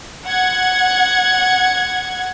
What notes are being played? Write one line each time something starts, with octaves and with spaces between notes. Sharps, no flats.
F#5 G#6